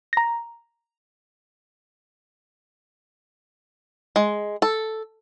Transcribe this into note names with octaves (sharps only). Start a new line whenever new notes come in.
A#5 A#6
G#3
A4